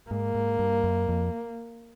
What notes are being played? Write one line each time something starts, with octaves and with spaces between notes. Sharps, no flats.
G#2 A#3
G#2
G2
F#2
F2